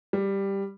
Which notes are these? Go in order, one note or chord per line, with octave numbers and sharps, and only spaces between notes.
G3